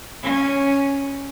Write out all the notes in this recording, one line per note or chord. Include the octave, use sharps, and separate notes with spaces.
C#4